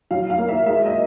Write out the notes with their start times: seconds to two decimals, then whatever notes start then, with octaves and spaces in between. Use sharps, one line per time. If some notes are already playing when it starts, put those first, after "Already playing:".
0.11 F#3 F5
0.30 F5
0.38 A#3
0.49 E5
0.66 G#3 E5
0.86 D#5